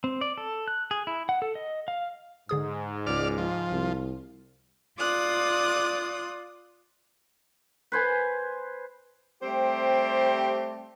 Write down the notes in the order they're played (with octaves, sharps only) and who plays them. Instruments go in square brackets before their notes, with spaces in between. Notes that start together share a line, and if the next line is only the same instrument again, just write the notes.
[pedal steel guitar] C4
D5
A4
F#6
G#4
E4
F#5
A4
D#5
F5
[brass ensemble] G#2 [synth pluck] D3 G#4 D#6
[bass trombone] C#2 [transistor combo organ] D5 F6
[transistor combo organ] F3
[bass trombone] C2
[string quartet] F4 D5 D#6 F#6
[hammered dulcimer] B4 C5 G#5
[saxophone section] G3 A3 C4 G4 C5